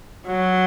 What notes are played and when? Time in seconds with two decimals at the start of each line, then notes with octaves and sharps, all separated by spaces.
0.27 F#3